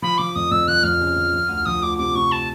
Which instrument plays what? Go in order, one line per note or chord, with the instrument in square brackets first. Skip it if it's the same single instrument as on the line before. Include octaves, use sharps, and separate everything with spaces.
[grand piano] F3 [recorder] B5
[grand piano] F3 [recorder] D6
[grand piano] F2 [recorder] D#6
[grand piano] F2 [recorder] E6
[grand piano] F3 [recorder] F#6
[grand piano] F2 [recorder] F6
[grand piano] C#3
F3
F3
D2
[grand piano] F3 [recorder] D#6
[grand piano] D2 [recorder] D6
[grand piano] C3 [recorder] D6
[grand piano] C3 [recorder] C#6
[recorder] A5